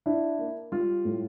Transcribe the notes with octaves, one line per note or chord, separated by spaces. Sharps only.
D4 E4
A#3
G3 F4
A2